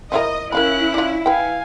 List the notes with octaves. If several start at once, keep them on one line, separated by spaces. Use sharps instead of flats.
F3 E4 A#4 D#5
C#4 E4 A#4 F5 B5 F#6
D4 F4
B4 F5 G5 G#5